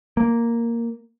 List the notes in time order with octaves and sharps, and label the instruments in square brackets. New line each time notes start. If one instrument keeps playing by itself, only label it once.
[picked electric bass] A#3